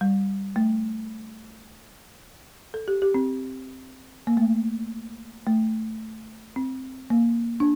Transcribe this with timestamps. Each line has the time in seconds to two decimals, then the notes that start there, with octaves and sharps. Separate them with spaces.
0.01 G3
0.56 A3
2.74 A4
2.88 G4
3.02 G4
3.14 C4
4.27 A#3
4.37 A3
5.47 A3
6.56 C4
7.10 A#3
7.60 D4